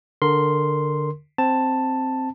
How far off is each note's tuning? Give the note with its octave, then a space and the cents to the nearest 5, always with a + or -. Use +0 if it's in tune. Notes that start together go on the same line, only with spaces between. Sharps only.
D3 +5 A#4 -5 C6 +0
C4 +0 A5 +5